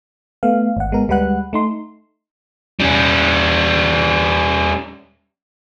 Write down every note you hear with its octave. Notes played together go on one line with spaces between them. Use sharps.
A3 B3 F5
G#1 F#5
G#3 B3 A#4
D2 G3 G#3 B4 F#5 F#6
A3 D#4 C6
G3 C#4